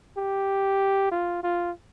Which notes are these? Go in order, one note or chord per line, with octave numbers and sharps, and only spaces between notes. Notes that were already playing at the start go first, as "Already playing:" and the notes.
G4
F4
F4